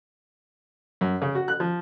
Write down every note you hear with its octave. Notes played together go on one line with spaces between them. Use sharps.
F#2
C#3
F#4
F#6
F3